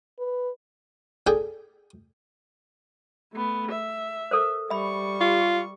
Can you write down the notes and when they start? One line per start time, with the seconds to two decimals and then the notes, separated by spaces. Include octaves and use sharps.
0.19 B4
1.27 D4 G#4 A4 G5
3.33 A3 B3
3.71 E5
4.31 A4 A#4 C5
4.70 G3 E5 B5 C#6
5.21 F4 G4